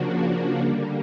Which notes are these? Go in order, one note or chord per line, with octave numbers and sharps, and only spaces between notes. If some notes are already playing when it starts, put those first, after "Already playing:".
Already playing: C#3 F3 A#3 D4 F#4
D3 G3 A#3